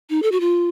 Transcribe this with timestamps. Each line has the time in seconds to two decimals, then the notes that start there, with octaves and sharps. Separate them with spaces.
0.10 D#4
0.23 A4
0.32 F#4
0.40 F4